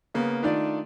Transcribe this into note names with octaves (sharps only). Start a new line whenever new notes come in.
C#3 A#3 B3
D#3 A3 D4 D#4 F4 D5